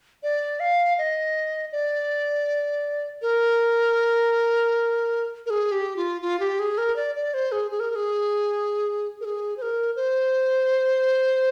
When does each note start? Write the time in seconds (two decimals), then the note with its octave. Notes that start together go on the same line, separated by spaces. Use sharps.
0.23 D5
0.60 F5
0.98 D#5
1.72 D5
3.22 A#4
5.46 A#4
5.50 G#4
5.72 G4
5.97 F4
6.22 F4
6.40 G4
6.59 G#4
6.78 A#4
6.96 D5
7.15 D5
7.34 C5
7.52 G#4
7.71 G#4
7.80 A#4
7.90 A#4
7.95 G#4
9.21 A#4
9.25 G#4
9.57 C5
9.62 A#4
9.96 C5